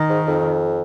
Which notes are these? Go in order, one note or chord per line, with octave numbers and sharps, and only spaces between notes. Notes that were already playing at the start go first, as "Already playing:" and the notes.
Already playing: D#3
G#2
F2